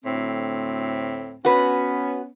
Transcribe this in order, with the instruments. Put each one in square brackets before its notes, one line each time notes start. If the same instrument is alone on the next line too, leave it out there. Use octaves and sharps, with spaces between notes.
[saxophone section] D2 A2 C4
[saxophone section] B3 C#4 [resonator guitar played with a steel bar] F#4 B4